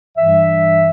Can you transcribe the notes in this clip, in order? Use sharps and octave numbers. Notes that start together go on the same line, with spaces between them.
G2 E3 G3 E5